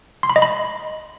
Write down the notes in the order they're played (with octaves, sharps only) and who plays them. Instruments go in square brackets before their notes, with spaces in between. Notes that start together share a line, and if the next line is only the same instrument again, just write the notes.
[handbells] C6
B5
D#5
B5